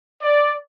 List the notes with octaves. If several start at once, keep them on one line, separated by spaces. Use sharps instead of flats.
D5